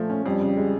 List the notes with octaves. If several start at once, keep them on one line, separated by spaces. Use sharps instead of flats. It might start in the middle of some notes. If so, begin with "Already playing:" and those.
Already playing: A#2 F3 A3
C#4
F2 G3
C#3
G#3